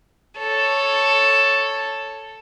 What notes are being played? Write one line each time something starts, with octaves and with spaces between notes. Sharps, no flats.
A4 C#5